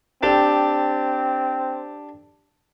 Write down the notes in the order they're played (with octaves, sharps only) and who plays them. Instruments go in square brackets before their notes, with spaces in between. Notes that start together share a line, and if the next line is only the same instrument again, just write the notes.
[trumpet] C4 [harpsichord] D4 G4 A4